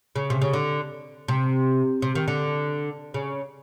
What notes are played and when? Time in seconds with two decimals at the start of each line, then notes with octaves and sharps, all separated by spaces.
0.16 C#3
0.30 C3
0.42 C#3
0.53 D3
1.28 C3
2.02 C3
2.15 D#3
2.28 D3
3.14 C#3